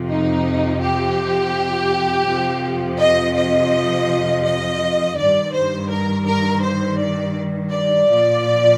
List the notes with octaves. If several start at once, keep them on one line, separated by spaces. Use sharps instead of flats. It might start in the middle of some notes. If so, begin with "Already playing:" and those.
Already playing: F2 C3 F3
D#4
G4
F2 C3 F3
D#5
D#5
D#5
G2 D#3 D5
C5
A#4
A#4
C5
D5
D5
A#2 F3